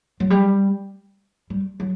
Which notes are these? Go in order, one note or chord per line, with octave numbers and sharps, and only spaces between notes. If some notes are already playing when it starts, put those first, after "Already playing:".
F#3
G3
G3
F#3